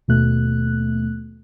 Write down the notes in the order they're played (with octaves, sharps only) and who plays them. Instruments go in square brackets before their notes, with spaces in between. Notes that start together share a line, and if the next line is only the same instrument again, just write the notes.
[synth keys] D#2 B2 A3 F#6